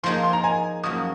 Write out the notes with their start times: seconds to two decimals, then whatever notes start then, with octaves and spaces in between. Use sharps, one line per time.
0.03 F3 A#3 D#4 G#4 C6
0.23 C6
0.33 A#5
0.44 G#5
0.83 F#2 F3 A#3 C#4 F#4 D#6